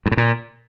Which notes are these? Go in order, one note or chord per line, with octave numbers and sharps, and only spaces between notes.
G2
A2
A#2